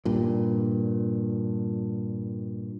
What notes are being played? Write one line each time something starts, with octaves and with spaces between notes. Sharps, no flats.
G2 A#2